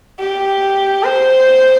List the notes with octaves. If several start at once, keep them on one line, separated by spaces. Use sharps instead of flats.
G4
C5